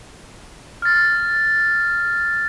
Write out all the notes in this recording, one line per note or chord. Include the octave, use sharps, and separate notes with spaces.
F6 A6